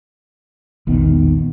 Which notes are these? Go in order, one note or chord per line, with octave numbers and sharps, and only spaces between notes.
E1 A#1 D#3 B3